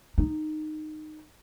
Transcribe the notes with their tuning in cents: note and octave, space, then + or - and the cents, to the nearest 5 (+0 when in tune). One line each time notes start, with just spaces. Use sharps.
D#4 -15